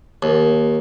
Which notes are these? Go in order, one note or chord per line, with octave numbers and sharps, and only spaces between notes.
D#2